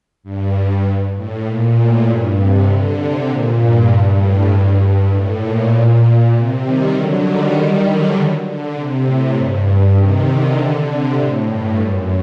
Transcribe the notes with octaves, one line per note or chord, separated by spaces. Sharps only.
G2
A2
A#2
A2
G2
C3
D3
C3
A#2
G2
A2
G2
G2
A2
A#2
A#2
A#2
C3
D#3 G3
D3 F#3
D#3 G3
D3 F#3
D3
C3
A2
G2
C3 D#3
D3
C3
A2
G2
F#2